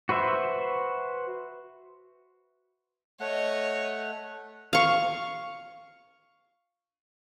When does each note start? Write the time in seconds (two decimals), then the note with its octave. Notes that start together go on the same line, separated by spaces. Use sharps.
0.09 F#4 B4 C5 E5
3.20 A3 C#5 D#5 F#5
4.73 F5 C#6